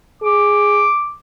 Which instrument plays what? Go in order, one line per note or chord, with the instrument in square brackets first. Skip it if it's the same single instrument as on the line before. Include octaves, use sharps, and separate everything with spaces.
[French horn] G#4 [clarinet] D6